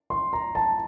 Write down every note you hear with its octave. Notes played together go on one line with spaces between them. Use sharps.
C6
A#5
A5